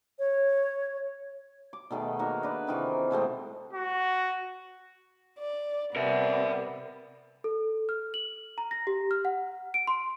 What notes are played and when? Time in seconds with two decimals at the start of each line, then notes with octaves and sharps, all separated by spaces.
0.19 C#5
1.73 D6
1.91 B2 D#3 A3 G#4
2.19 A#3 D#4 F#4 A#4
2.43 D4 B4
2.67 C3 D#3 E3 F4
3.11 B2 G#3 A3 C4
3.73 F#4
5.40 D5
5.96 C3 G3 B3 A#4 E5
7.44 A4
7.89 F6
8.14 F#7
8.58 A#5
8.71 A#6
8.87 G4
9.11 F6
9.25 F#5
9.74 D7
9.87 C6